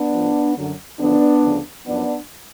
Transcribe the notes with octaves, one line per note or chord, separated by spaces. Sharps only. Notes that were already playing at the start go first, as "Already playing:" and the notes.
Already playing: B3 D4
A2 F3
F#2 D3 F#3
F#2 D3 F3 B3 D4
D2 C#3 F3
F#2 F3 B3 D4